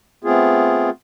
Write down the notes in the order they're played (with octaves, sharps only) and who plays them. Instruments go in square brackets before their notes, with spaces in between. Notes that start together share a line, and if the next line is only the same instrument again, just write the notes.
[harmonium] A3 B3 C4 F4 G#4